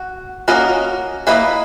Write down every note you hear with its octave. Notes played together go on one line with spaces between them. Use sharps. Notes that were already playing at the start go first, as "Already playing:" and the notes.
Already playing: F#4
A#3 C#4 F#4 A#4 D#5
A#3 E4 B4 D#5